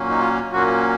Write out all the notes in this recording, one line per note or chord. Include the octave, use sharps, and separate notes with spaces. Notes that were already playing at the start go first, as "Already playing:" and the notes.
Already playing: A#2 F#3 A#3 C#4
D#4
F4
A#2 F#3 A#3 C#4 F#4